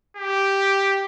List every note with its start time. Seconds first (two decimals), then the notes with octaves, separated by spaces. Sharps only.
0.17 G4